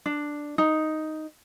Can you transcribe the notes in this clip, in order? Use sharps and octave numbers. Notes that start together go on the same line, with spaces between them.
D4
D#4